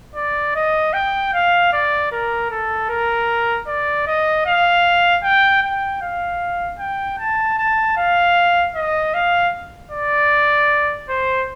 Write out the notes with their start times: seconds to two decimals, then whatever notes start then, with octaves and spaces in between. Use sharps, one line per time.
0.15 D5
0.55 D#5
0.93 G5
1.34 F5
1.73 D5
2.12 A#4
2.51 A4
2.89 A#4
3.67 D5
4.07 D#5
4.46 F5
5.23 G5
5.62 G5
6.02 F5
6.79 G5
7.19 A5
7.58 A5
7.97 F5
8.76 D#5
9.14 F5
9.92 D5
11.09 C5